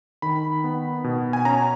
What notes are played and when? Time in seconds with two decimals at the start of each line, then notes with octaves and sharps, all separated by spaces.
0.22 D#3 B5
0.64 B3
1.04 B2
1.33 G#5
1.45 C#4 A#5